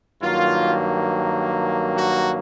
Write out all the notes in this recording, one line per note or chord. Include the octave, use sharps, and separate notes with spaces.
G2 D#3 F#3 A#3 F4
F#4